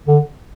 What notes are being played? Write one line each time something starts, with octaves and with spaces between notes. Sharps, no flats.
D3